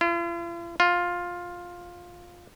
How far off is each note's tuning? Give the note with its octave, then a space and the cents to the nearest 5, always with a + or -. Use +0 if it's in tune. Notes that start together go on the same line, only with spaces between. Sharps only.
F4 -45
F4 +10